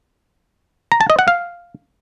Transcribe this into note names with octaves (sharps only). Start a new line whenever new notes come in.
A#5
A5
D#5
F#5
F5